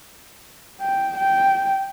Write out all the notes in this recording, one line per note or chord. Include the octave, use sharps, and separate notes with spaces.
G5
G5